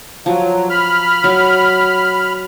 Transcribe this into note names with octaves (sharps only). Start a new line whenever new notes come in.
F3 F#3
B5 F6
F#3